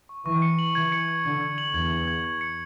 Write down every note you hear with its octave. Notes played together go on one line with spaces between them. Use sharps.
C#6
E3 C#6
C#7
F#7
E3 G#6
C#7
G#6
D3 G#6
G#6
F#7
E2 G#6
F#7
G#6
G#6
C#7